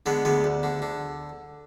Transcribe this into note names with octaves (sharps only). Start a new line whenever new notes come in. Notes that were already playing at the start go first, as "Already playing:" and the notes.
D3 G#3 B3
D2 G#3 B3
D2
D3
D3